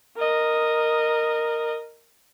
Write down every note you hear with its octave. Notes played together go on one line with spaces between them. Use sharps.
A#4 D#5